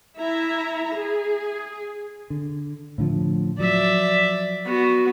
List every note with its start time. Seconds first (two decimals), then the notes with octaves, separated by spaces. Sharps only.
0.18 E4 E5 A#5
0.95 G#4
2.30 D3
2.98 A2 D3 F3
3.59 F3 F#3 D5 E5
4.65 B3 F#4